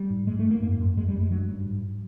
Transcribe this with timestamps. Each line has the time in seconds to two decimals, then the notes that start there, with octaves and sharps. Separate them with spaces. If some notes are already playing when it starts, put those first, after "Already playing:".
Already playing: G3
0.10 G#2
0.27 G#2 G#3
0.39 A3
0.45 G#2
0.51 A#3
0.62 F#2 A#3
0.80 F#2
0.97 F#2 G#3
1.08 G3
1.15 F#2
1.20 G#3
1.31 G2 F#3
1.49 G2
1.66 G#2